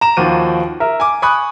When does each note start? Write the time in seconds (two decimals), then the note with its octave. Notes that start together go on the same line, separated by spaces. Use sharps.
0.01 A#5 E7
0.17 D#2 F3 F#4 D#7
0.80 A#4 E5
1.00 G#5 D6
1.22 G#5 B5 C#6 D#6 F#6